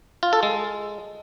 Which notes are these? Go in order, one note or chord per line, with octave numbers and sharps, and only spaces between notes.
F4
A4
G#3